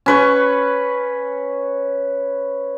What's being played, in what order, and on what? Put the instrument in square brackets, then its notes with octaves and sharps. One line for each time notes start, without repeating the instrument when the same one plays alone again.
[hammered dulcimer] C#4 B4 C#6